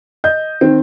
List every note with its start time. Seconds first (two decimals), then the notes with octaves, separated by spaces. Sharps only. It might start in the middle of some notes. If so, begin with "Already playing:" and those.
0.24 D#5 G6
0.61 D#3 C4